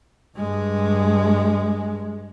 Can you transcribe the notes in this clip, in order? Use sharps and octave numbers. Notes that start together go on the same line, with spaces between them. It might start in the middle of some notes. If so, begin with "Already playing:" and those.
G2 G#3